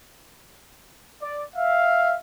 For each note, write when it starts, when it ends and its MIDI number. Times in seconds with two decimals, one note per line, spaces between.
1.22 1.44 74
1.56 2.15 76
1.56 2.15 77